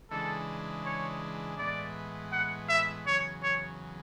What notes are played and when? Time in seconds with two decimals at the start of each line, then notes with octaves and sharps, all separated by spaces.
0.11 C#3 E3 G#3 D4 A4
0.86 C#5
1.58 A2 E3 G#3 B3 D5
2.32 F#5
2.69 E5
3.06 E2 C#3 F#3 C#5
3.43 C#5